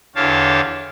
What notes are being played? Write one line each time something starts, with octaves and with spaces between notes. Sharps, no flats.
E2 D3 G4 C#5 F5 A5